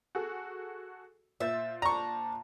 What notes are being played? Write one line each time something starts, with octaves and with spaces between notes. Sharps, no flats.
F#4 G#4 A4
A#2 C5 E5 A6
D4 A#5 C#6